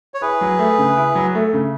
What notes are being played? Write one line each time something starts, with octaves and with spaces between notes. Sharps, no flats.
C#5
E4 G#4 B4
F#3
A3
C#3
E4
F#3
A3
C#3